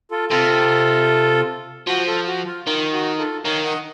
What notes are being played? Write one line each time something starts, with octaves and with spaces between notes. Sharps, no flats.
F4 A4
C3 F4 A4
F3 F#4
F4 A4
F#4
F4
D#3 F4
F#4
F4 A4
D#3 C#5 F5
D#5 F#5